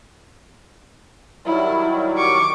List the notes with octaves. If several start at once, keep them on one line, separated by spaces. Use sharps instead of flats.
D#3 F#3 G3 E4
C#6 D6